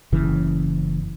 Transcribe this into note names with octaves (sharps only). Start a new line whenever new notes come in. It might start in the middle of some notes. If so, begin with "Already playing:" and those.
F#1 C#3 E3